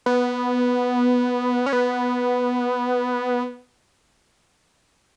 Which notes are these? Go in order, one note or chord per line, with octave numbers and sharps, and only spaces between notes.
B3
C#4
B3